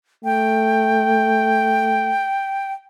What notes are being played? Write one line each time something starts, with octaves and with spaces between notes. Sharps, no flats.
A3 G5